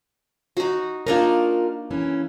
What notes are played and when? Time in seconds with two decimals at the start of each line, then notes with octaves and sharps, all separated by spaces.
0.57 D#4 F#4
1.07 A#3 D4 D#4 F4 A#4
1.91 E3 C#4